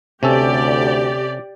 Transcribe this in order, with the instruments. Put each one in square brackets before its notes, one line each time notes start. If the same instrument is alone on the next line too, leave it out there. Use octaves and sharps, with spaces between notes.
[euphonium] D2 [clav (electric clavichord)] C3 C#4 A4 [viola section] G4 D5